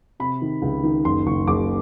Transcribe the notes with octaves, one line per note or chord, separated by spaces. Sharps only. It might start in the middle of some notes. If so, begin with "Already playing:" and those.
C3 B5
D#3
C#2
D#3
F#1 C6
F#1 C#6
F#1 D6